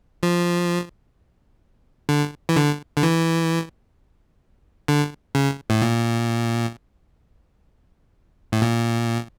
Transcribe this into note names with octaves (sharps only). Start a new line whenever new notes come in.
F3
D3
E3
D3
D3
E3
D3
C#3
A2
A#2
A2
A#2